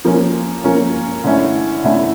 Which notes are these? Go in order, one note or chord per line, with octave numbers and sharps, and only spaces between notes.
F3 A#3 C#4
F3 A#3 C#4
D3 A3 C#4 E4
D3 A3 C#4 E4